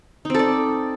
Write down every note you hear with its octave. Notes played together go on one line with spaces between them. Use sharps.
C4 D#4 A4 D5